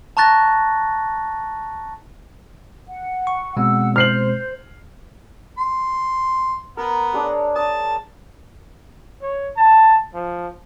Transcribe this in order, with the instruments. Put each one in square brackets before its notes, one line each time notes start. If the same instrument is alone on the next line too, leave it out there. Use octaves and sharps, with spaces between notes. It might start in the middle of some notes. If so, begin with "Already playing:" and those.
[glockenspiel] A5 A#5 C#6 F#6 A6 A#6
[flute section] F#5
[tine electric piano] C#6
[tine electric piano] B2 G#3 C4 [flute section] F#5 E6
[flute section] C5 [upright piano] F6 C7 F#7
[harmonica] C6
[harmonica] B3 [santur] A#4
[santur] D4 G#4 C#5
[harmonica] A5 [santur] D#6
[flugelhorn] C#5
A5
F3